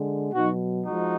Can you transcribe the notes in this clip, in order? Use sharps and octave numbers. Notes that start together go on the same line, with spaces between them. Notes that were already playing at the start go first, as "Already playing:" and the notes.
Already playing: D3 G#3
B2 F#3 D#4 F#4
F3 G#3 D#4 F#4